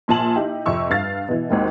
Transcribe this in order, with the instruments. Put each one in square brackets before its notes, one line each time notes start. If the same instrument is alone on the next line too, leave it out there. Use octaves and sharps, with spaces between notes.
[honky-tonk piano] A#1 A#2 G#5 A5 F#7
D#4 E4 G4
F2 C3 C#6 E6
G2 F5 A6
B2 E3
G#1 D#2 G#2 D#3